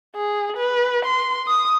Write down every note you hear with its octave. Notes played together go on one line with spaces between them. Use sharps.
G#4
B4
C6
D#6